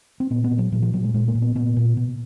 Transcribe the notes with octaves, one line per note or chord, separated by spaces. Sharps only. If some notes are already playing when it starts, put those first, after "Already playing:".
C4
A#2 B3
B3
A#2
F#3
A#2 F#3
F3
A#2 F#3
G#3
A#2 G#3
A#3
A#2
B3
A#2 B3
A#2
B2